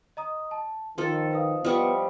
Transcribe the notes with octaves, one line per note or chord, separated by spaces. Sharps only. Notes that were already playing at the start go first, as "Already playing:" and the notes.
D#5 A#5 D#6
A5
D#3 F3 A4 C6 A6
B4 F5 D#6
F3 G3 B3 D#5 C#6 D#6